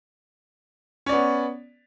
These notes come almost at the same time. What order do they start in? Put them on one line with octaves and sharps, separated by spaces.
C#4 D5 B3